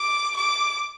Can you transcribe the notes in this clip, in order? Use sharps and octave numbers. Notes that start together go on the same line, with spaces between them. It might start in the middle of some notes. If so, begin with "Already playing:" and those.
Already playing: D6
D6